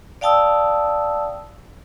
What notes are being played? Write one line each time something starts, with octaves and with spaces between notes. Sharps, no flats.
D5 F5 G5 A5 D#6 E6